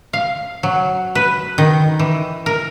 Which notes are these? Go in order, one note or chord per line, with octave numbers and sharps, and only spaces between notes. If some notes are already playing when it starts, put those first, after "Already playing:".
F5
F#3
B4
D#3
E3
A#4